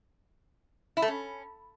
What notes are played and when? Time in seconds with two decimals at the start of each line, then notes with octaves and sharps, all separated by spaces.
0.97 E4
1.02 A3
1.08 C#4